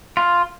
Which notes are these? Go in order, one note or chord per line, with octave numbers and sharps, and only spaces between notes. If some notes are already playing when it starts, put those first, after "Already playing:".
F4